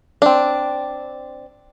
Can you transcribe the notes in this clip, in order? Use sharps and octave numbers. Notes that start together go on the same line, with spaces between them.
C4 D4